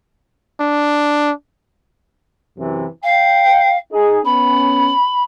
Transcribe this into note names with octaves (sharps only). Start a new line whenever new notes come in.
D4
F#2 C3 E3
F5 G5
D#4 G#4
B3 C#4 B5